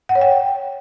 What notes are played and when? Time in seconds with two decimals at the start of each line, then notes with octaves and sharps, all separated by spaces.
0.09 F#5
0.15 C#5
0.21 G5